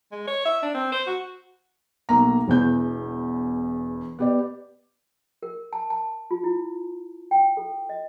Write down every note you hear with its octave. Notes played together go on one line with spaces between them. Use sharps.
G#3
C#5
E5
D4
C4
C5
F#4
B1 A#3 A#5
E1 E2 G6
B3 G4 D5
A#4
A5
A5
F4
E4
G5
A4
D#5